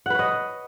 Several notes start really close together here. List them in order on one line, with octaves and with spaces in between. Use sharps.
F#5 B4 C#5 D#5